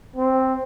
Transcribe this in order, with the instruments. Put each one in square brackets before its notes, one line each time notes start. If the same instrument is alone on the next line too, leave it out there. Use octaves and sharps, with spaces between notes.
[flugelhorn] C4